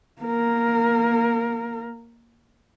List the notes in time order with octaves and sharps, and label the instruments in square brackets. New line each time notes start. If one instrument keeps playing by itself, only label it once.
[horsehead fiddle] A#3 A#4